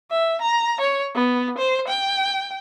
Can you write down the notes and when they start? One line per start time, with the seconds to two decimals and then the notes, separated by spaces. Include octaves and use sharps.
0.11 E5
0.42 A#5
0.81 C#5
1.15 B3
1.58 C5
1.88 G5